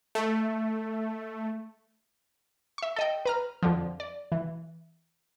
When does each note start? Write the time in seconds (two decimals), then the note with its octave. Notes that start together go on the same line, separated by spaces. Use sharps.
0.15 A3
2.78 E5 C#6
2.96 A4 D#5 G5
3.25 B4 A#5 F6
3.63 F2 D3 F3
4.00 D5
4.32 E3